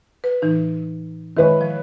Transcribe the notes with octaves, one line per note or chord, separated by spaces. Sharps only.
B4
A2 E3 D#4
D#3 G#3 E4 B4 C#5
F3